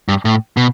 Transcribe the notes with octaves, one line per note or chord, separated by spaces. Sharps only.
G2
A2
B2